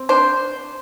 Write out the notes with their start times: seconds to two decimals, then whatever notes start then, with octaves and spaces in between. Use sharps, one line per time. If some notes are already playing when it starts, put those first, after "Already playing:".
Already playing: C4
0.09 D4 C5